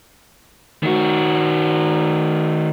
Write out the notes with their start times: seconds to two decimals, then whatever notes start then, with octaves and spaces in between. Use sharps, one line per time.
0.83 D#3 F#4